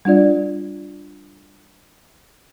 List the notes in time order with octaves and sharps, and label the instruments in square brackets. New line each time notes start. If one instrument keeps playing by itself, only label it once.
[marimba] G3 D4 F4 D5